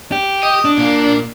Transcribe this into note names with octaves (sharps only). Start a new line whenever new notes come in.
G4
D#5
D4
A#2 A#3